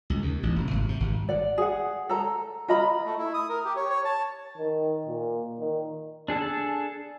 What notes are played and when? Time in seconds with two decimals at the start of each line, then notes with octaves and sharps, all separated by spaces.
0.10 C#2
0.22 D#2
0.43 A1
0.56 F1
0.71 G#1
0.89 C3
1.00 G#1
1.29 D5 F#5
1.58 G#4 F#5
2.09 A4 A#5
2.68 F4 D#5 A#5 B5
3.06 A3
3.18 E4
3.34 D#6
3.49 A#4
3.65 G4
3.76 C#5
3.90 C#5
4.05 A5
4.58 D#3
5.07 A#2
5.59 D#3
6.28 D4 G#4 A4 A5